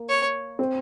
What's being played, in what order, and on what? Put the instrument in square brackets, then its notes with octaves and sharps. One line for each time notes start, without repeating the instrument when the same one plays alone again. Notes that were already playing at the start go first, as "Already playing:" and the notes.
Already playing: [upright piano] A#3
[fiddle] C#5
[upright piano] C4